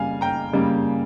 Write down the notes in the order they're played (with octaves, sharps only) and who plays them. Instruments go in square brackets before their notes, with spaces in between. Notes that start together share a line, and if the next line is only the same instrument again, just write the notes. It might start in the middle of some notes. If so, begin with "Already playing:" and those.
Already playing: [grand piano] C#3 G3 A#3 F5 G#5
G5 A#5
C#3 G3 A#3